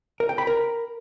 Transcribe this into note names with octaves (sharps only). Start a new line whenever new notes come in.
A#4
G5
B5
A#4